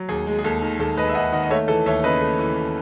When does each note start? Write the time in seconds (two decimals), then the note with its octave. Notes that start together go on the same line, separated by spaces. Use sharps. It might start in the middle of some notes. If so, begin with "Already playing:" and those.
Already playing: F#3
0.09 D#2 G#4
0.27 G#3
0.38 G#4
0.44 D#2 A4
0.62 D#3
0.79 D#2 A4
0.97 G#3 B4 D#5
1.09 E5
1.15 D#2 D#5 F#5
1.32 D#3 D#5 F#5
1.43 D#5
1.50 A3 C#5 E5
1.68 E3 A4
1.86 D#2 C#5 E5
2.04 C#3 B4 D#5
2.21 A3
2.39 E3